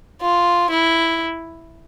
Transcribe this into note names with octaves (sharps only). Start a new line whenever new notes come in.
F4
E4